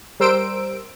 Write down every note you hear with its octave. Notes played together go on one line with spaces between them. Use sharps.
G3 A#4 C5 E6 D7